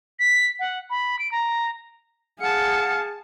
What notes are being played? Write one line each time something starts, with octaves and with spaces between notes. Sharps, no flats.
B6
F#5
B5
D7
A#5
G#4 F5 F#5 A5 C#7